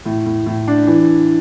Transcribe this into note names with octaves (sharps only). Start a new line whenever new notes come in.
A2
A2
A2
D4
E3